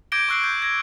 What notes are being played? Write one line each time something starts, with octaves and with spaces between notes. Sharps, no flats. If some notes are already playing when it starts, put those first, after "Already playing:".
D6 G6 G#6 A#6 D7 G7
C#6 E6 F#6 C7 D7
G6
G#6 A#6